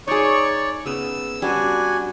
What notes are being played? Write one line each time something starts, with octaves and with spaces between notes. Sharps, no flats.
D#4 G#4 C#5 D5 C#6
C#3 B3 E6
G3 C#4 D4 F#4 G#5